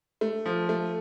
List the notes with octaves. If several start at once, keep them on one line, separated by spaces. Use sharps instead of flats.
A3
F3
A3